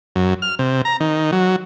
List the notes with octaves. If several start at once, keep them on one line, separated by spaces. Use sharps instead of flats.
F#2
F6
C3
A#5
D#3
F#3